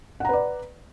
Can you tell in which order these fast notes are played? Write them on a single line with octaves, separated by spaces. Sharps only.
F#5 A#5 B4 D5